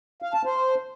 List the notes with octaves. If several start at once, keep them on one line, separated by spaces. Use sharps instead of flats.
F5
A5
C5